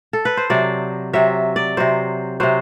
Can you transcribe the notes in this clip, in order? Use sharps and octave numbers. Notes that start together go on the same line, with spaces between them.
A4
B4
C5
C3 F#3 D5
C3 F#3 E5
D5
C3 F#3 C5
C3 F#3 C5